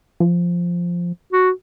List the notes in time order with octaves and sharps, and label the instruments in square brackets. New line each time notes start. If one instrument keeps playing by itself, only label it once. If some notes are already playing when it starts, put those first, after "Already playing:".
[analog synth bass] F3
[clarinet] F#4